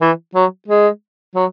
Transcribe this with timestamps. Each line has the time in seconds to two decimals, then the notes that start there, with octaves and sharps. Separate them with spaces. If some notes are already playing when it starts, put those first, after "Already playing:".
0.01 E3
0.35 F#3
0.68 G#3
1.35 F#3